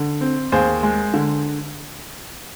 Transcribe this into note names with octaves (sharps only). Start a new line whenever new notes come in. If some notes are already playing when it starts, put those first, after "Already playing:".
Already playing: D3
C4
D#2 G#4 C5
G#3
D3